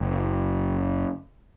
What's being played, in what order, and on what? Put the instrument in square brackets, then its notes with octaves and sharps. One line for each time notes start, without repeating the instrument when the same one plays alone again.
[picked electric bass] F#1